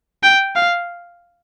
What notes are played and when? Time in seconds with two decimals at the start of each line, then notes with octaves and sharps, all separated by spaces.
0.23 G5
0.56 F5